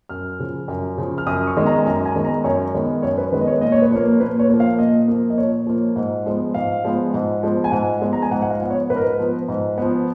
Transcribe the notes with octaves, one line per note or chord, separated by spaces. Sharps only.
F#2 F6
C#3 F3
F#2
C#3 F3
F6
F#2 D#6
C#6
D#3 G#3 B3
A#5
F#2 A#5
G#5
D#3 G#3 B3
A#5
F#2 C#5
D#3 G#3 B3
F#2 C#5
B4
D#3 G#3 B3 B4
D#5
C#5
A#2 D#5
C#5
B4
F3 A#3 C#5
A#2 B4
C#5
F3 A#3
F5
A#2 D#5
F3 A#3
D#5
A#2 C#5
F3 A#3
G#2
F3 G#3 B3
G#2 F5
F3 G#3 B3
G#2
F3 G#3 B3
G#5
G#2 F#5
F3 G#3 B3
A#5
G#5
G#2 F#5
F#5
F5
F3 B3
C#5
G#2 B4
A#4
B4
F3 B3
G#2
F3 B3